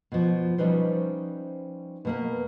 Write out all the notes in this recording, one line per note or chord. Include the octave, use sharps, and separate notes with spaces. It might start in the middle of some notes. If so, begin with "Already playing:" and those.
B2 F3
F3 G3 C#4 D#4 B4 C5
B2 A#3 B4